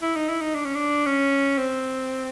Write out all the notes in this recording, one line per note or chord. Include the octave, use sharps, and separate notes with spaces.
E4
D#4
E4
D#4
D4
C#4
D4
C#4
C4